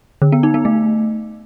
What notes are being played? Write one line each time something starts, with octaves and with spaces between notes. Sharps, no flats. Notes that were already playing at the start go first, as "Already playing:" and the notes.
D3
B3
D#4
B3
A3